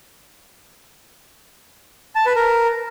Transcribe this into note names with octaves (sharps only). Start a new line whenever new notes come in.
A5
B4
A#4